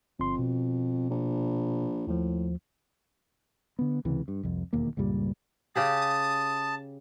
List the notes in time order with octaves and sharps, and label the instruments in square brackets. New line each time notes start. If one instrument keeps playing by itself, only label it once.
[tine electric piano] G1 C6 [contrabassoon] F2
[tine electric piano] B2
[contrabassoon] A#1
[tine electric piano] D#2 F3 [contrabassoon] A2
[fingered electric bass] D3 B3
C#2 C3 E3
G2
C2 F2
E1 D#2 A#3
C#2 G2 A#2 G3
[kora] C#3 G4 G#4 [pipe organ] A5 [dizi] D#6